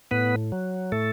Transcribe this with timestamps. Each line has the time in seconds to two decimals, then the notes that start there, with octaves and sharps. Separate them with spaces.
0.11 A2 B3 B4
0.52 F#3
0.92 A2 A3 A4